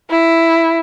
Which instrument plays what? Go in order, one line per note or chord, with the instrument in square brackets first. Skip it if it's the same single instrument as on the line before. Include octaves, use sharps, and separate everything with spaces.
[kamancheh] E4